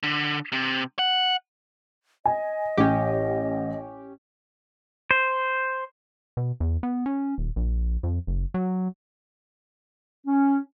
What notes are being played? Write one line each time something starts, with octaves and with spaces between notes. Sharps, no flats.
D3
C3
F#5
D#5 G#5
A1 C#4 G4
C5
B2
E2
B3
C#4
D#1
A#1
F2
F#1
F#3
C#4